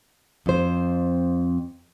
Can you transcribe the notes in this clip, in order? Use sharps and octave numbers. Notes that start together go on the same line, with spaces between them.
F2 C5